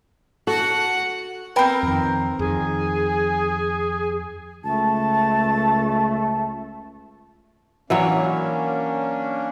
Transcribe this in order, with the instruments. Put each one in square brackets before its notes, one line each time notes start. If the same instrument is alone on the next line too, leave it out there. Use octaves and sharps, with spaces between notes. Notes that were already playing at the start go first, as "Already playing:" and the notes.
[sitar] F#4 [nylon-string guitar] A4 [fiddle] F#5
[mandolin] C4 A#4 [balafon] B4 G5 B5
[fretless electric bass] F2 D#3
[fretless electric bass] F2 D#3 [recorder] G#4
[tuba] C#2 [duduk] A3 [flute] A5
[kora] E3 F#3 C#5 [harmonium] A#3 C#4 D4